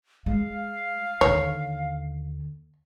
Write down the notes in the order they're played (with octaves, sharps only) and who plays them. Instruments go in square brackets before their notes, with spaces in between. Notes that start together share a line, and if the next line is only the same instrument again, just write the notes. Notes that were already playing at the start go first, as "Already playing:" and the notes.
[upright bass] G#3 [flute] F5
[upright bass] D#2 D3 [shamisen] C#5